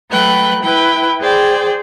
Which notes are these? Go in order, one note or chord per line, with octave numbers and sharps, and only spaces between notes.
F#3 A3 B4 G5 F#6
E4 B4 G5
G#4 C5 D5 G5